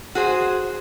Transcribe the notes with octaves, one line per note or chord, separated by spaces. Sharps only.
F#4 G#4 C5